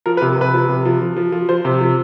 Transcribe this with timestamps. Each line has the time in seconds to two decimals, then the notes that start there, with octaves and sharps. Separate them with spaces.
0.06 F3 A#4
0.17 B4
0.22 C3
0.38 C3 B4
0.54 F3
0.69 C3
0.85 F3
1.02 F3
1.16 F3
1.32 F3
1.49 F3 C5
1.65 C3
1.81 F3